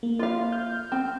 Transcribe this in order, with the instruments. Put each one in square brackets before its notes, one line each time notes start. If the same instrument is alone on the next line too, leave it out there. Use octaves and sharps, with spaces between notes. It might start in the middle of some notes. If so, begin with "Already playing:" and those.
[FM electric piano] A#3
[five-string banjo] F4 F5
[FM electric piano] F6 G6
[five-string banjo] C4